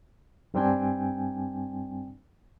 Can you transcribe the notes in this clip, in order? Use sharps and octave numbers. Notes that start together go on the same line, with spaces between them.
G2 G3 C4 D4 G5 G#5